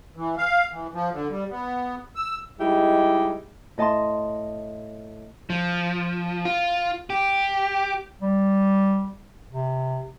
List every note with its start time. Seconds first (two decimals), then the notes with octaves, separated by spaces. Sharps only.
0.17 E3
0.38 F5
0.72 E3
0.93 F3
1.13 D3
1.30 G3
1.51 B3
2.16 E6
2.60 G3 G#3 D#4 E4 G4
3.78 A2 D#5 A5 C6
5.50 F3
6.45 F4
7.10 G4
8.22 G3
9.52 C3